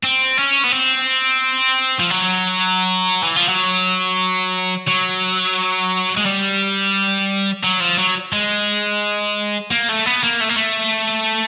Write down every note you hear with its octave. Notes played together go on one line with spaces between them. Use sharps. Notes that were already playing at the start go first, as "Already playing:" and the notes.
C4
C#4
B3
C4
F3
F#3
E3
F3
F#3
F#3
G#3
G3
F#3
F3
F#3
G#3
A#3
A3
B3
A#3
A3
A#3
A3